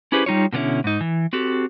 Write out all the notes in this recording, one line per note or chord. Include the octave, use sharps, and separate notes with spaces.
C#4 E4 G4 G#4 B4 C5
G3 D#4 F4 C#5
B2 D3 B3 C#4 E4
G#2 D#4
E3
C4 F#4 G4 A4